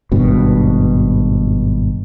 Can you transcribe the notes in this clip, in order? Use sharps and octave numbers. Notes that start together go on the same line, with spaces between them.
G#1 G2 B2